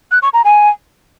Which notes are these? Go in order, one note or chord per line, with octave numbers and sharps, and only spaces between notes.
F#6
C#6
A#5
G#5